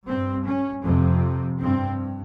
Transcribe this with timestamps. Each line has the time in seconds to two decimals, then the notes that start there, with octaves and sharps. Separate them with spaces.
0.09 G2 C4
0.47 C#4
0.85 F2 C3 C4
1.61 G2 C4